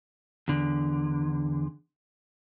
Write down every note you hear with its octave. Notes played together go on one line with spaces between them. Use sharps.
E2 D3